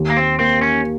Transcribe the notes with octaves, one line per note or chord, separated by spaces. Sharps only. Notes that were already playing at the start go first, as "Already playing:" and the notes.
Already playing: D#2
A#3
C4
A#3 C4
C#4